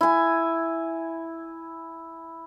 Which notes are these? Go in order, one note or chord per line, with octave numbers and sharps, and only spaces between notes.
E4 G#5